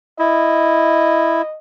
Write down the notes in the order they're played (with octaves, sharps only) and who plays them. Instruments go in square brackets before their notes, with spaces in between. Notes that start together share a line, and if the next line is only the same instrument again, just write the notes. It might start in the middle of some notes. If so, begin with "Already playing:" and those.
[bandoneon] E4 [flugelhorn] D#5